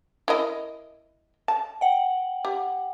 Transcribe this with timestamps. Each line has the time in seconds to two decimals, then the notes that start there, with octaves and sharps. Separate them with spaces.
0.28 E4 A#4 D#5
1.48 A5
1.81 F#5 G5
2.45 G4